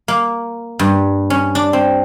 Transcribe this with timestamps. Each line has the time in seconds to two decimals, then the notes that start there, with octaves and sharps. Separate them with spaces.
0.08 A#3
0.79 G2
1.30 C#4
1.55 D4
1.73 C4